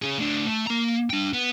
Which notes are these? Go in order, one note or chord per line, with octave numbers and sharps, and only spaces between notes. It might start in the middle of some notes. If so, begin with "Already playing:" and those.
C#4 G#4
A2 D4
A3
A#3 A#5
D4 G5
B3